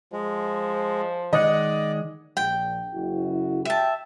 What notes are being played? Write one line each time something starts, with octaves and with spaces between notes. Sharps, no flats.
F3 G#3
D#3 G#3 D5 D#5 F#5
A#1 F3 G5
F#1 E4 F#4
E5 G5 A5